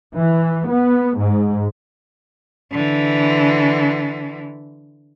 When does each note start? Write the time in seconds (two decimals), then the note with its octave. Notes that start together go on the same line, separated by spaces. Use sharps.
0.16 E3
0.70 B3
1.19 G#2
2.72 D3 E3